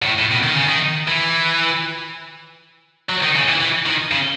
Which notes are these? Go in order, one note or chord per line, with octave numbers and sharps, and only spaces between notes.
B2
A2
A2
B2
D#3
C#3
D#3
E3
F#3
D#3
C#3
E3
E3
D#3
C#3